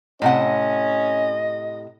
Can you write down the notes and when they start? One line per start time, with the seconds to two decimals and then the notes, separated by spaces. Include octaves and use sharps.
0.22 A2 C3 C#4 D#5 F#5